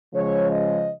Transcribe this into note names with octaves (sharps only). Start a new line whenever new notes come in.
C#3 F3 G#3 C#5
D#5